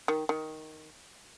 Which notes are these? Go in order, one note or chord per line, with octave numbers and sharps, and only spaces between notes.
D#3
D#3